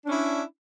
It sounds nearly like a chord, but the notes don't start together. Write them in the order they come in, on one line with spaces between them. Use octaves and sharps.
D4 C#4 E4